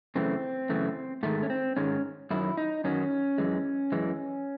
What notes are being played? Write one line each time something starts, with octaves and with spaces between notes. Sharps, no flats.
F#2 C#3 E3 A3 C4
F#2 C#3 E3 A3
G#2 D#3 G#3 A3
C#4
C4
G#2 D#3 G#3 C#4
F#2 D#3 F#3 E4
D#4
F#2 D#3 F#3 C#4
F#2 E3 G#3
F#2 E3 G#3